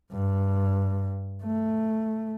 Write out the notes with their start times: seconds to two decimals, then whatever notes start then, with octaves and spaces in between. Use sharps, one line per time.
0.12 G2
1.43 A3